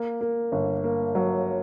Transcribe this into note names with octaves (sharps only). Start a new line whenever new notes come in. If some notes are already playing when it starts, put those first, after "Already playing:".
Already playing: A#3
A#3
G1
A#3
F#3